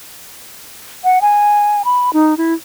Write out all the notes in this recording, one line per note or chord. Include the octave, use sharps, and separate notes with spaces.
F#5
G#5
B5
D#4
E4